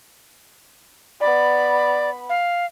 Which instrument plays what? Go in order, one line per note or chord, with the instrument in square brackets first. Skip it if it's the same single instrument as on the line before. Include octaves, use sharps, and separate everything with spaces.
[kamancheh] B3 B5 [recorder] D5
[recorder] F5